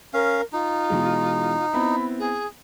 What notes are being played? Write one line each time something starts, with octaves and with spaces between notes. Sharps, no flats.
C#4 A#4 F5
D#4 F4
B2 E3 G#3
B3 C4 E4 B5
G#4